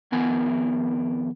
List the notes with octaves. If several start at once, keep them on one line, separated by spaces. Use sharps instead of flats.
F2 D#3 B3 A#4 G#5